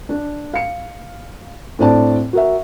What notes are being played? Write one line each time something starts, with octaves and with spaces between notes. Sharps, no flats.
D4
F5 C#7
A2 C4 D4 D5 A5
F#4 A#4 E5